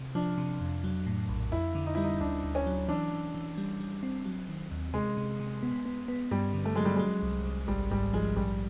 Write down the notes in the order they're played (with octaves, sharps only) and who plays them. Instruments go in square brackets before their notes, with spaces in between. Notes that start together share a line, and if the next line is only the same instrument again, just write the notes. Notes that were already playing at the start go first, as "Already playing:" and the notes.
Already playing: [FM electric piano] C3
[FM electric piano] F3 [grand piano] D4
[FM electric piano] C3
F2
F#3
A2
A#1
[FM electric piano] F2 [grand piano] E4
[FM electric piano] D3
[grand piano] D#4
[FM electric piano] G3 [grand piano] E4
[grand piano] D#4
[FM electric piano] D2 [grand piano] D4
[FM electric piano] D2
[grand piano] C#4
[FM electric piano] F#3
[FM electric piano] E3 [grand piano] D4
[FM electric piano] E3
E3
G3
G3
C4
F#3
D#3
D#2
[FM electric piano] C3 [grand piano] G#3
[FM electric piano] C3
C3
B3
B3
B3
[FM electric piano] G2 [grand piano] G3
[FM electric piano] D3
[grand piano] A3
[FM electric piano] F#3 [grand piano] G#3
[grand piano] G3
[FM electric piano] F#3 [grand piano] G#3
[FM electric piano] C2
C2
[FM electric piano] G#1 [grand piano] G3
[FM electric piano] G#2 [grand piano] G3
[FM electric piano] F3 [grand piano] G#3
[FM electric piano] A#1 [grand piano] G3